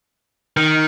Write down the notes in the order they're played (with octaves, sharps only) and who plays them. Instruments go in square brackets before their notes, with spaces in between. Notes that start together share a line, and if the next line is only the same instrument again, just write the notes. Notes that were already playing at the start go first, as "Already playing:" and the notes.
[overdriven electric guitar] D#3